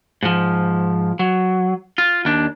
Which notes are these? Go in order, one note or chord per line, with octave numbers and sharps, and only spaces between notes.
G#2 F3
F#3
F4
D#2 D4